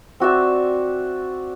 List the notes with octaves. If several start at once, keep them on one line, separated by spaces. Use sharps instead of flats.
C4 F#4 D5 E5